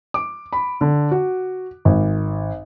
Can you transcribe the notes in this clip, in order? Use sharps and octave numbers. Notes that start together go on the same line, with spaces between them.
D6
B5
D3
F#4
G#1